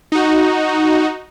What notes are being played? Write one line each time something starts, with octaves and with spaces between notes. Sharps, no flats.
D#4 F#4